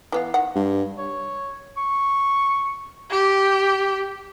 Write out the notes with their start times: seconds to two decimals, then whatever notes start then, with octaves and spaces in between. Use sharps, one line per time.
0.12 E3 B3 F5
0.34 D#3 F#5
0.55 G2
0.98 C#5
1.77 C#6
3.10 G4